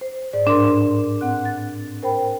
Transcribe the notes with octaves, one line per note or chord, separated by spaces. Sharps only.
C5
G#2 D5
A2 D4 A#4 C6
C4 F#5 F#6
A6
A#4 C5 G5 B5